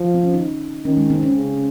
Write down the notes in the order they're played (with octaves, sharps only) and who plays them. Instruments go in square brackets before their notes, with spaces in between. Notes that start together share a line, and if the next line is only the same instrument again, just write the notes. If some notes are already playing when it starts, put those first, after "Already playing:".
Already playing: [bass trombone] F3
[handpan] C4
C#4
D#4
[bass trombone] D#3 [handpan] C#4
[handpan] G#3
C4
C#4
[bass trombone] C#3